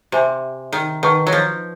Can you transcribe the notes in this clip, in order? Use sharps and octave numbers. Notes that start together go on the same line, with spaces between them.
C3 G4 C5 E5 G#5 C6
D#3
D#3 B4 D#5 F#5 A5 C#6
F#3
F3